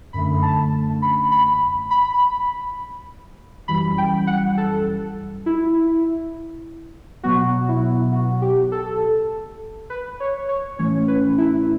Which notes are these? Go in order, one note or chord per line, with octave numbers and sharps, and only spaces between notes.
F#2 D3 A3 B5
A5
B5
B5
B5
F#2 E3 G3 B5
G5
F#5
A4
E4
B2 F#3 B3 F#4
E4
F#4
G4
A4
B4
C#5
C#5
A2 E3 A3 C#4 C#5
B4
E4